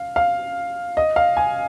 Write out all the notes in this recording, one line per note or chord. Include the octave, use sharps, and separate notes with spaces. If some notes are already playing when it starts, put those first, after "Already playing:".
Already playing: F5
F5
D#5
F5
G#5